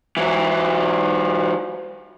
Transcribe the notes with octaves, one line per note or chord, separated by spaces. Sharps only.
E3 F#3